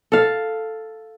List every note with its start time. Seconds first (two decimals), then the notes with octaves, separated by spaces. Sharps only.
0.12 A4 F5